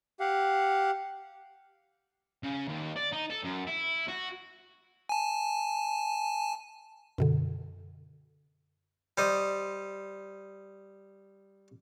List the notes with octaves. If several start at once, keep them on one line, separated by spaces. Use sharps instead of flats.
G4 F5 F#5
C#3
D#2
D5
D#4
A4
F#2
E4
F#4
G#5 A5
F#2 B2 D3
G3 C5 D#5